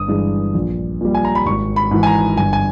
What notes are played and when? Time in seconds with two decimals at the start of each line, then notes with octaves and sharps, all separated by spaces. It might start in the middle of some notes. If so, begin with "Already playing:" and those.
Already playing: G1 D#6
0.08 G2 E3 G#3
0.54 A#1
1.01 A#2 G3
1.15 G#5
1.25 A#5
1.35 B5
1.46 G#1 C#6
1.76 B5
1.91 G#2 E3
2.03 G#5
2.07 A#5
2.37 G1 G#5
2.53 G#5